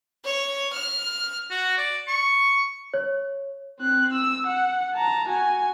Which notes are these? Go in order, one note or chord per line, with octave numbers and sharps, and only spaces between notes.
C#5
F6
F#4
D5
C#6
C#5
C4 F#6
E6
F#5
A5 A#5
F#4 G#5